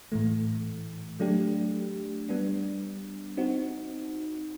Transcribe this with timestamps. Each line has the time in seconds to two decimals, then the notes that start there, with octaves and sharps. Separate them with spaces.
0.12 A2 E3 A3
1.20 F#3 A3 D4 G4
2.29 G3 B3 D4
3.37 C4 D#4 F#4